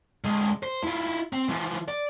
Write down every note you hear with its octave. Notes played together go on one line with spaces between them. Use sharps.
D3 G#3
C5
E4 F4
C4
E3 F3
D5